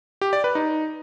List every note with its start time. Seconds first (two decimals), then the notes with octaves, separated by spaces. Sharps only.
0.22 G4
0.33 D5
0.44 B4
0.55 D#4